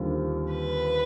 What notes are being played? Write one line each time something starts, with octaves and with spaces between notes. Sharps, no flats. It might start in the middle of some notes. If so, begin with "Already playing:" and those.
Already playing: D#2 D3 G3 C4 F4
B4